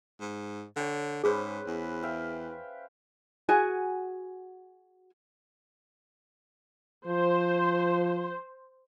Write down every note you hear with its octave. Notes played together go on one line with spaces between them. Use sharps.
G#2
D3 C#5 G5
G#2 C#4 G#4 B4 C5
E2
E5 F5 G5
F#4 G#4 F#5 G#5
F3 C5